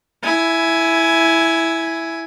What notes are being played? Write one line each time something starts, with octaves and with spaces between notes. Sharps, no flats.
E4 G#5